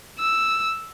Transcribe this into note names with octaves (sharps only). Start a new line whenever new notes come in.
E6